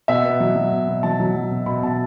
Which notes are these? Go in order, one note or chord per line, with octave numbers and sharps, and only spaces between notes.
B2 E5
B3
F#3
F#3
B2
B2
F#3 A5
F#3
F#3
B2
B2 B5
B2 A5